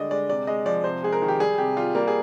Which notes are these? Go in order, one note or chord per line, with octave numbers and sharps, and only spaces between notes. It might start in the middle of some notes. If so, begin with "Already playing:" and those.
Already playing: D3 G3 G#3 D5 D#5
G#3 D5
C3 D5
G#3 D#5
F3 D5
C3 C5
G#3 G#4
A#4
D#3
G4
G3 G#4
C3 G4
G3 F4
G3 A#3
G#4